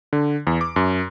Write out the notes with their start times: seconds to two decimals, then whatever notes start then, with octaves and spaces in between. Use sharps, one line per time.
0.13 D3
0.47 E2
0.61 D6
0.76 F#2